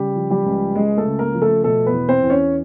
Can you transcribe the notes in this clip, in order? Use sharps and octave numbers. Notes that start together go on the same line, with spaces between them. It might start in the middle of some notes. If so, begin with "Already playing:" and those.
Already playing: C#3 G3 G4
F3
G3 G4
C#2
C#2 G#3 G#4
A3 A4
C#3
A#3 A#4
F3
A3 A4
B2 A3 A4
B3 B4
E2
C4 C5
E2
C#4 C#5